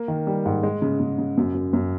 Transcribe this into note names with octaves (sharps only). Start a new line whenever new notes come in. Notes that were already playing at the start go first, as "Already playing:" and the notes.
Already playing: A#3
D#3
G3
G#2
G#3
C#3
C#3
C#3
F#2
F#2
F#2